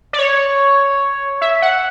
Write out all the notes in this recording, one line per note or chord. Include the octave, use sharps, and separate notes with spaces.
D5
C#5
E5
F#5